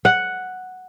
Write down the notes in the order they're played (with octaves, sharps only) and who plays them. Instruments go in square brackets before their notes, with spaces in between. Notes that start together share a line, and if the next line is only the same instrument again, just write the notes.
[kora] F#5